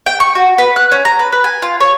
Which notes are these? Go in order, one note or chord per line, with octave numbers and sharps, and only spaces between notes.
G5
C#6
F#4
B4
F#6
C#4
A#5
B4
B4
G#5
F4
C#5